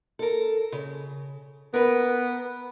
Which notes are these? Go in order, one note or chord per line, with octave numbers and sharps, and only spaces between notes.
A4 A#4
C#3
B3 A#4 B4